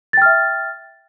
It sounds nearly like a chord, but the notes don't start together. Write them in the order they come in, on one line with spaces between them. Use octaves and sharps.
A6 G5 F6 E5